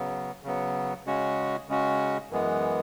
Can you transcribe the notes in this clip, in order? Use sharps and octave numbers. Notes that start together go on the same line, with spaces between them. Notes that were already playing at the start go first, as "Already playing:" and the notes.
Already playing: C#3 F#3 B3
C#3 F#3 B3
C#3 G#3 C#4 F#4
C#3 G#3 C#4 F#4
F#2 E3 G#3 B3